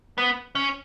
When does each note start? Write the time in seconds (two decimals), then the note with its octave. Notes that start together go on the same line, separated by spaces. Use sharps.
0.18 B3
0.55 C#4